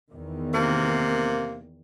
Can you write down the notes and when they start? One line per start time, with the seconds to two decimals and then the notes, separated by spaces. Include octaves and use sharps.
0.11 E2 D#3
0.54 C3 A#3